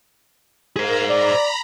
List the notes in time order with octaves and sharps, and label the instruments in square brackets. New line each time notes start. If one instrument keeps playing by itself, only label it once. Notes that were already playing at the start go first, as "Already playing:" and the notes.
[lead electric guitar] G#4 C5 [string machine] A#4 F5 A#5
[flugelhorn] D5 [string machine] A#5 B5